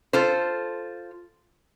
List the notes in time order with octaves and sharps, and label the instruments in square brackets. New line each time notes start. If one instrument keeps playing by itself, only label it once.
[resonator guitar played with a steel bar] F4 A4 C5